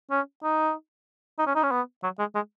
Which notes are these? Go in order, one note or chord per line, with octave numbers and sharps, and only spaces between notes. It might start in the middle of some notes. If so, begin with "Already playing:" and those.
C#4
D#4
D#4
C#4
D#4
C#4
B3
F#3
G#3
G#3